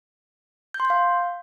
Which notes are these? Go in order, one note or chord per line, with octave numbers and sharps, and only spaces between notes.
G6
C6
G6
F5